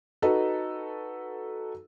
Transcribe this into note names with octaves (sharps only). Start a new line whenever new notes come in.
D#4 F#4 A4 B4